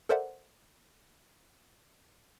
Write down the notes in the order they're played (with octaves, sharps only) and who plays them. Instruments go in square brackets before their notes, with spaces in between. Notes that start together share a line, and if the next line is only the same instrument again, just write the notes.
[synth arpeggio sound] A4 A#4 C5 D5 E5 F#5